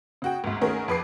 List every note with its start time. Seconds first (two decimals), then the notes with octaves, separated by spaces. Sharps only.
0.22 C#3 F#4 G5
0.44 G#1 D2 G#2
0.61 D#3 A3 C#4 F#4 G#4 A#4
0.88 F2 B4 D6 C7